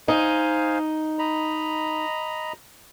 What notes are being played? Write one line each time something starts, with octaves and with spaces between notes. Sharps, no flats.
D#4 C5 F5 G#5
D#5 A#5 B5